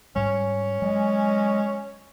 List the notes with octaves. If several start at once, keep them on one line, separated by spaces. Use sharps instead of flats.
G#2 G3 C#4
F#3 G#3